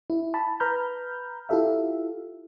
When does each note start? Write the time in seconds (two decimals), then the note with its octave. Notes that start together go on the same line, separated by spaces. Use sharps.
0.10 E4
0.34 A5 B5
0.60 B4 A#5 B5 F6 G6
1.49 E4 F4 G4 A4 E5 F5